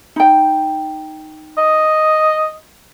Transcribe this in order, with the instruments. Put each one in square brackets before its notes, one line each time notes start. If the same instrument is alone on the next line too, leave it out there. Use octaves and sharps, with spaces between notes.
[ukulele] D#4 G5
[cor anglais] D#5